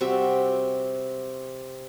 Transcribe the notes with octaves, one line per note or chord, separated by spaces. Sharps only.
C3 G3 F#4 E5